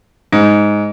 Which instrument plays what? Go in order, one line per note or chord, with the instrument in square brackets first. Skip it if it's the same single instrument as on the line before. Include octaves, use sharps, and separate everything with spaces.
[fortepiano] G#2